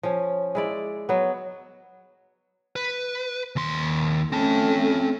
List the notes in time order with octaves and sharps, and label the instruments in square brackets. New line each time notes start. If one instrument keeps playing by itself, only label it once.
[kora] F3 C#4
G#3 E4 D5
F#3 B3
[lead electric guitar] B4
D#2 C6
[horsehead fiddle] A3 C#4 [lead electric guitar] C4 A5